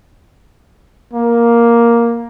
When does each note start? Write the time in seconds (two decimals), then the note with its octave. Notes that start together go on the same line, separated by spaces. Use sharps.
1.13 A#3